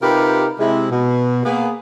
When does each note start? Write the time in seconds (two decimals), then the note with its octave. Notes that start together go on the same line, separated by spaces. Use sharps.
0.02 C3 D#4 F4 G4 A#4 B4
0.59 C3 G#3 E4
0.91 B2
1.45 A#3 B3 G#4